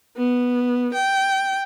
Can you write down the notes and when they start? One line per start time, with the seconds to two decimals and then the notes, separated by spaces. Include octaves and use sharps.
0.17 B3
0.94 G5